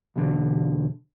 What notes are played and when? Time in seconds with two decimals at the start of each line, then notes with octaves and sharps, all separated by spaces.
0.16 B1 E2 D3